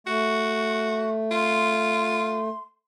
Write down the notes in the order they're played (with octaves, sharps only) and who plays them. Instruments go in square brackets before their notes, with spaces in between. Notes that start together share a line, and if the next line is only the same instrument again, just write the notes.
[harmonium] A3 [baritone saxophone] F#4 [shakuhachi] C#6
[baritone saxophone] F4 [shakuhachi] C6